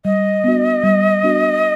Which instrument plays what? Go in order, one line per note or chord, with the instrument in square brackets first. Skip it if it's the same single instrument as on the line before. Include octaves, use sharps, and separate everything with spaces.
[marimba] G3 [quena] D#5
[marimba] B3 D4 F#4
G3
B3 D4 F#4